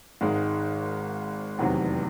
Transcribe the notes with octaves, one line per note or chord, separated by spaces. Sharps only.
G#1 G#2 D#3 G#3
F1 E2 C3 D#3 F#3